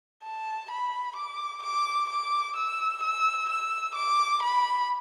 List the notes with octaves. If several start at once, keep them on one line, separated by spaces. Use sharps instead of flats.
A5
B5
D6
D6
D6
E6
E6
E6
D6
B5